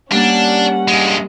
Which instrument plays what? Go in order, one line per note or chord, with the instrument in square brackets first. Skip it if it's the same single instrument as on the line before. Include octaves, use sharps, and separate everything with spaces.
[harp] G3 A#3 [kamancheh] C#4 F#5 [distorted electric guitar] D4
[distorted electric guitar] G2 G#3